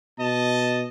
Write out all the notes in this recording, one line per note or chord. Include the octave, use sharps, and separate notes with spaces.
B2 D#5 A5